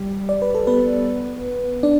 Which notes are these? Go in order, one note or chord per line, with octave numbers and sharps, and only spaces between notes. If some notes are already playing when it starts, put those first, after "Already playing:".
Already playing: G3 G4
D5
B4
A4
B3 B4
D4 D5